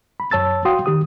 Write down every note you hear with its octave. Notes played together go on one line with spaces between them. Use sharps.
B5
F#2 C#5 A5 E6 A6
F#4 F5 G5 C6 D#6
D#3 G4 D#6